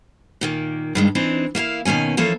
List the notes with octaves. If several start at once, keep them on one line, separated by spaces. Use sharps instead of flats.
A#2 D#3 A#3
G2 D#3 G#3
E3 C4 D4 D#4
A#3 E4 A#4 F5
B2 D#3 A#3 C#4 G#5
E3 F3 A#3 C#4 A4 C#5